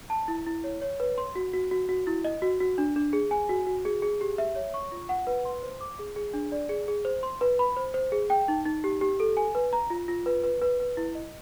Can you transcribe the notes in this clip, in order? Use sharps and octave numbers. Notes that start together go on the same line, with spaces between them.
A5
E4
E4
C#5
C#5
B4
C6
F#4
F#4
F#4
F#4
E4
D#5
F#4
F#4
D4
D4
G#4
G#5
F#4
F#4
G#4
G#4
G4
E5
C#5
C#6
F4
F#5
B4
C6
C5
D6
G#4
G#4
D4
D5
G#4
G#4
C5
C6
B4
B5
C5
C5
G#4
G5
D#4
D#4
G4
G4
A4
G#5
B4
A#5
F4
F4
B4
B4
B4
B4
E4
D#5